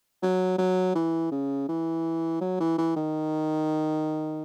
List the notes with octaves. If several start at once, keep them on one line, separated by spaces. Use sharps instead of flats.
F#3
F#3
E3
C#3
E3
F#3
E3
E3
D#3